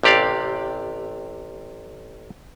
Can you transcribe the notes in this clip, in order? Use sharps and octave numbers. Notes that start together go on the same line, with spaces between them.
A1 C3 G4 D5 F5